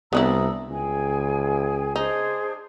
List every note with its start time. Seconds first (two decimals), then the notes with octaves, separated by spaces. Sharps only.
0.13 C2 B3 D4 E4 A#5 D#6 E6
0.69 C#2 G#4 G5 G#5
1.96 D4 D#4 G#4 C5